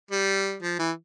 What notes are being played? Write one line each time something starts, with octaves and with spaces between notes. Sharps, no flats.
G3
F3
E3